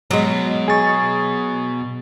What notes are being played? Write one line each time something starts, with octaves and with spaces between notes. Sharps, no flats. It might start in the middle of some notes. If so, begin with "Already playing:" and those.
B2 F#3 G#3
G#4 G#5 C#6 A6